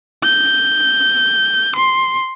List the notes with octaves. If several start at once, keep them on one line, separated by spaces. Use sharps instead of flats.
G6
C6